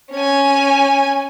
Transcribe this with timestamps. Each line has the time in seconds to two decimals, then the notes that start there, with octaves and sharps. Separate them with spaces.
0.13 C#4 G#5